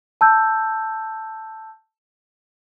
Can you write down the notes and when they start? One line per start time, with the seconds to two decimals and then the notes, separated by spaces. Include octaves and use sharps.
0.21 A5 E6 G6